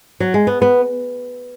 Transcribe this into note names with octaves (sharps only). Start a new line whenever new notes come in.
F#3
G#3
B3
B3